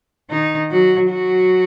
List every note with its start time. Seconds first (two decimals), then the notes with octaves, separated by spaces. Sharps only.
0.30 D#3 D#4
0.71 F#3 F#4
1.10 F#3 F#4